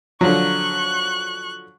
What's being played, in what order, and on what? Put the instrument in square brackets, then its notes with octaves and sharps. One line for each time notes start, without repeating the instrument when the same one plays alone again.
[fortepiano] D3 F3 F#3 [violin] C#6 F#6